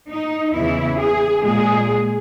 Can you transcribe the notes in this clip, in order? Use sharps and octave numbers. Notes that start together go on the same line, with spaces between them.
D#4
E2 C#3 E3 E4
G#4
A#2 G#3 G#4